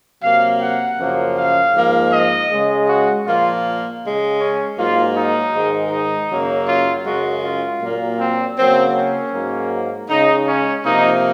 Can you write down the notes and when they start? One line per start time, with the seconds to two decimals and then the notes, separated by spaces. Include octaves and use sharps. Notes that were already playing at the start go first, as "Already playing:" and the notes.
0.21 C3 F#3 A#3 F5
0.60 F#5
0.98 F#2 C#3 F3 A#3
1.36 F5
1.74 G#2 F3 A#3
2.11 D#5
2.50 C#3 G#3
2.87 F#4
3.25 A#2 F3 A#3 F4
4.01 C#3 G#3
4.40 C#4
4.77 G#2 F#3 A#3 F4
5.15 D#4
5.54 G#2 D#3 G#3
5.91 D#4
6.29 F#2 C#3 F#3 A#3
6.66 F4
7.05 F#2 C#3 G#3 F#4
7.43 F4
7.81 A#2 F#3 A#3
8.19 C4
8.57 C#3 F#3 A#3 C4
8.94 C#4
9.33 G#2 F#3 A#3
10.09 C#3 G#3 D#4
10.46 C#4
10.84 C3 F3 A#3 D#4